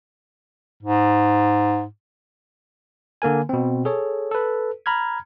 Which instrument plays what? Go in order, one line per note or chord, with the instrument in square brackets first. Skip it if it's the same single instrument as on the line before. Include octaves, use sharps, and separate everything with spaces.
[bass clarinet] G#2
[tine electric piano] D3 A#3 A#4 G#5
B2 C4
G#4 A4 C#5
A4 B4
A#5 B5 F6 G#6